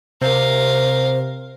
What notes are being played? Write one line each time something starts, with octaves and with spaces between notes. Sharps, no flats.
C3 A#4 C5 F5